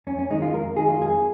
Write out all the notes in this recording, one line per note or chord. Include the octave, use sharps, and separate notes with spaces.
F2 C#4
C#4
D#3 G#3 D#4
F4
F2 A#4
D#3 G#3 G#4
F4
F2 G#4